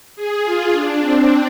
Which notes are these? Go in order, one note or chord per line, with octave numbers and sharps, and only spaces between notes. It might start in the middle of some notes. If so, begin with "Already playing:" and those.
G#4
F4
D4
C4